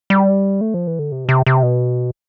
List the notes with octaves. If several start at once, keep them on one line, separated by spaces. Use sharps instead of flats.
G3
A3
F3
E3
D3
C3
B2
C3
C3
B2